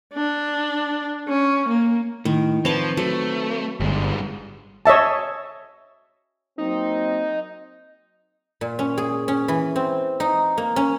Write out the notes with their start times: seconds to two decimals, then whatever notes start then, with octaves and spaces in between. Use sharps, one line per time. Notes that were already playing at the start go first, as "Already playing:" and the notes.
0.14 D4
1.28 C#4
1.69 A#3
2.25 A2 D#3
2.65 F3 C4 B4 C#5 A5
2.97 F#3 A3
3.80 G1 G2 G#3
4.86 C#5 D#5 E5 A5
6.58 F#3 A#3 C4 D#4
8.61 A#2
8.79 C#4
8.98 G#4
9.28 C#4
9.48 E3
9.76 C4
10.20 D#4
10.58 A#3
10.76 C#4